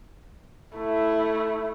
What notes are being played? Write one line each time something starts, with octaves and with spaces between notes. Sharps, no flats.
A3 E4